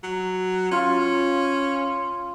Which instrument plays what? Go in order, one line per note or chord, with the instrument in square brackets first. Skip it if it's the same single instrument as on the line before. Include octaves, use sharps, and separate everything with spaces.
[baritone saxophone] F#3
[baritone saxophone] C#4 [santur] F4